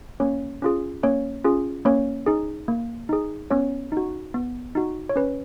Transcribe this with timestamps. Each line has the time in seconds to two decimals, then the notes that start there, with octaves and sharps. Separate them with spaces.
0.20 A#3 C#4 C#5
0.62 C#4 F4 G#4
1.03 A#3 C#4 C#5
1.44 C#4 F4 G#4
1.85 A#3 C#4 C#5
2.26 D#4 G#4
2.68 A#3
3.09 D#4 G#4
3.51 B3 C#4 C#5
3.92 D#4 F#4
4.34 B3
4.75 D#4 F#4
5.09 C#5
5.16 C#4 B4